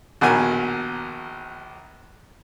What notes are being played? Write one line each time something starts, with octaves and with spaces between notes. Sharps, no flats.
A#1 D#2 B2 F#4 A#4 G#5